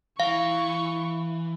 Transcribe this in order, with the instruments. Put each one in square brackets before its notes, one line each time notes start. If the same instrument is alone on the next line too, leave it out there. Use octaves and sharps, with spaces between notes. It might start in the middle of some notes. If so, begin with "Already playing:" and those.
[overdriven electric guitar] E3 [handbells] F5 [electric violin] C#6